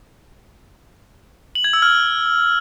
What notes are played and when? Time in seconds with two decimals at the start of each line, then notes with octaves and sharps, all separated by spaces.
1.55 F#7
1.64 G#6
1.73 E6
1.82 F6